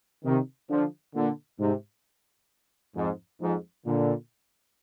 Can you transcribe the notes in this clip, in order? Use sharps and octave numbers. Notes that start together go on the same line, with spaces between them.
C3 D#3
D3 F3
A#2 D3
G#2 C3
F2 G#2
F2 G#2
A#2 D3